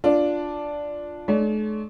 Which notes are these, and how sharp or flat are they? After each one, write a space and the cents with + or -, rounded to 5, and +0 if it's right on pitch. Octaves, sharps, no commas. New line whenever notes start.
D4 +0 F4 +0
A3 -45 D4 +45 C#5 +40